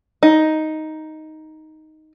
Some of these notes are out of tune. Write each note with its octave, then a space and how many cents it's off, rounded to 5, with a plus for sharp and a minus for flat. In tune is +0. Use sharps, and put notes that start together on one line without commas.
D#4 +5